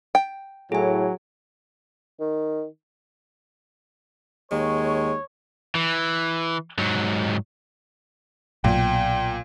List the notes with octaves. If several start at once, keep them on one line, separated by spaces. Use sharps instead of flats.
G5
A2 F#3 G#4 G#5
D#3
D#2 G#3 C#5
E3
G#2 F#3
B1 A#2 G5